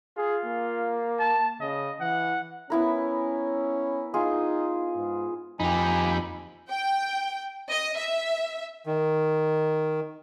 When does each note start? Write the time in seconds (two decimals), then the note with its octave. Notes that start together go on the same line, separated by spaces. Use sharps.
0.17 F4 G#4
0.46 A#3
1.19 A5
1.60 C#3 D#5
2.00 E3 F#5
2.70 B3 C#4 E4 A#4
4.14 D#4 F4 G#4
4.96 G#2
5.60 F2 D#4 G4 G#5 B5
6.70 G5
7.70 D#5
7.98 E5
8.85 D#3